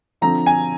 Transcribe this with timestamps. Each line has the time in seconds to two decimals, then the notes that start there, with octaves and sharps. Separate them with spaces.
0.21 D3 F3 C4 A#5
0.46 G#5